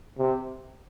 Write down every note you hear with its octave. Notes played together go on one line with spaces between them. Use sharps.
C3